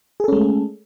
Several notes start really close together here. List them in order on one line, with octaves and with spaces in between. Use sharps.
G#4 A4 C#4 G#3 A3